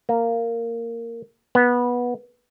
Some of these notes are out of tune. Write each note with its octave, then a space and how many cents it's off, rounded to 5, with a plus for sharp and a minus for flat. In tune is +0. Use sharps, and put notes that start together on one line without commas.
A#3 -10
B3 -15